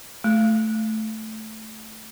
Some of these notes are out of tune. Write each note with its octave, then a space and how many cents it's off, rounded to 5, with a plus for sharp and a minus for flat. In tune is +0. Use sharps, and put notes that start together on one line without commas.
A3 -5